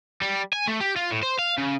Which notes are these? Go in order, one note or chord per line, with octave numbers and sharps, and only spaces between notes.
G3
G#5
A3
G4
F4
A2
C5
F5
C#3